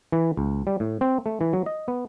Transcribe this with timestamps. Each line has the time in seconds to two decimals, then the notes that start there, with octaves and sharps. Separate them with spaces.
0.12 E3
0.37 C#2
0.67 G3
0.80 A2
1.01 C4
1.26 A3
1.41 E3
1.53 F#3
1.66 D#5
1.88 B3